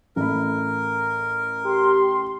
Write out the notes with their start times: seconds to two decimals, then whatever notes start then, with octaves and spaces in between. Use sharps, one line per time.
0.16 A1 A3 A#4 B5
1.65 G4 C6